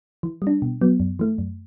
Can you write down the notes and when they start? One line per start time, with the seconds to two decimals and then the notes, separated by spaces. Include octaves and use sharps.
0.23 E3
0.42 G3
0.47 D4
0.62 B2
0.81 F#3 B3
1.00 F#2
1.19 E3 A3
1.38 F#2